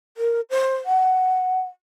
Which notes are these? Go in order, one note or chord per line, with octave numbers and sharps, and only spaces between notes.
A#4
C5
F#5